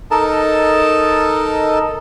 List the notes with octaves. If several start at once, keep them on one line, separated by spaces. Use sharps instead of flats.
D#4 A4 A#4 D#5 A5